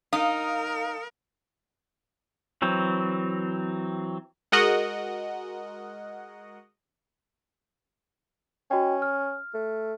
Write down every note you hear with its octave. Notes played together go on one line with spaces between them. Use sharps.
D#4 A#4 F5 D#6
E3 F#3 C4
G#3 F#4 A#4 D#5 F#5
C#4 F#4 D#5 G5
F6
A3